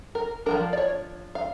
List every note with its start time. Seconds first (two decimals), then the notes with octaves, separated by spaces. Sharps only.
0.15 A#4
0.46 F3 A#3 D4 A#4
0.73 D5
0.77 C#5
1.35 F5